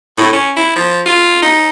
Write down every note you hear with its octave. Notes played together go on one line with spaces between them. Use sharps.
A2
C#4
E4
F3
F4
D#4